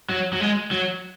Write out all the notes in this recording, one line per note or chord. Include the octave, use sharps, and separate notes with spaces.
F#3
F#3
G#3
F#3